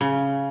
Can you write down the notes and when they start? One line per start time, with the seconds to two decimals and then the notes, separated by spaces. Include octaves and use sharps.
0.01 C#3